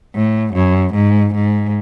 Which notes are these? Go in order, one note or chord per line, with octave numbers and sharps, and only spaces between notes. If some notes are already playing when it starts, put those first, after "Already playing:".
A2
F#2
G#2
G#2